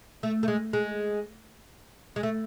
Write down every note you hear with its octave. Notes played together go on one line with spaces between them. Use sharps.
A3
A3
G#3
G#3
G#3
A3